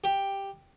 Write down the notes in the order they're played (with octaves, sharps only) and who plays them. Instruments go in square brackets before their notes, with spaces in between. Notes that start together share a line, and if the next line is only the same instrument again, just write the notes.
[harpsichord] G4